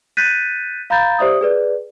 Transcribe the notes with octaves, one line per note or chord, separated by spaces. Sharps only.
F#6 G6 A6 B6 D#7
F5 A#5 B5 G6 A6
G4 C5 D5 E5 D#6
G#4 B4 D5